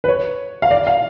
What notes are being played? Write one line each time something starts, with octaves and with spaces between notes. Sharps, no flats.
B4
C#5
F5
D5
F5